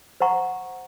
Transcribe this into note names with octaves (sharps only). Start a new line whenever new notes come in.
C5 F#5 A#5 C#6